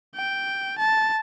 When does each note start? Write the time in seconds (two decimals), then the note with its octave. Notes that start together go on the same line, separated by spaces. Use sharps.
0.15 G5
0.79 A5